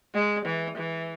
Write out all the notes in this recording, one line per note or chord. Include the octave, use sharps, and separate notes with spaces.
G#3
E3
E3